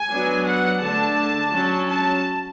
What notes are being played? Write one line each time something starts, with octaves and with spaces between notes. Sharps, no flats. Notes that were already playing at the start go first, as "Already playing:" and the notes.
Already playing: G#5
F#3 B3 D4
F#5
D3 A3 D4 A5
F#3 C#4
A5